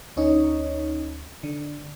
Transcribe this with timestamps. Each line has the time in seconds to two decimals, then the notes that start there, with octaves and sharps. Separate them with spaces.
0.16 D2 C#4 D#4 C#5
1.43 D3